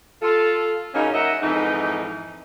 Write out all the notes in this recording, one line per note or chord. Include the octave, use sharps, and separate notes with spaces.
F4 A4
F#2 C#3 F#3 A#3 C#4 D#4
F#3 D#4 A#4 D#5 E5 F#5
F2 G#2 E3 D#4